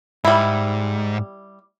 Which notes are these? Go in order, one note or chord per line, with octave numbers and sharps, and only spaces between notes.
G#2 G3 E4